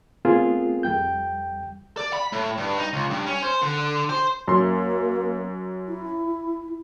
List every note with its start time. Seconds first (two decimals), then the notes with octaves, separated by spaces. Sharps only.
0.25 A3 B3 C4 F4 G#4 A#4
0.83 F2 G3 G5 G6
1.97 D5
2.13 B5
2.32 A2
2.58 G2
2.78 D#4
2.93 C#2
3.11 G2
3.26 C#4
3.43 C5
3.62 D3
4.10 C5
4.48 F#2 A#3 A#4 C6
5.88 E4